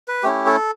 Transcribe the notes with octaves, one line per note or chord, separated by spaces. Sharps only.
B4
A3 C#4 E4 G4
A4